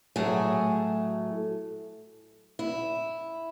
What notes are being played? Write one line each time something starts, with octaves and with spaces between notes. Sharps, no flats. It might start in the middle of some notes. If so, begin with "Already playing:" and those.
A2 F#3 A3 G#4
E4